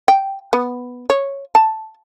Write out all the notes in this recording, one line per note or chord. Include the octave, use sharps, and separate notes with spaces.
G5
B3
C#5
A5